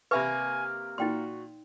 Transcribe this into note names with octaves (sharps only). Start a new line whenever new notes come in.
C3 A#3 B4 E5 G#5 B5 C#6
A#2 D#4 F#4 G5 C6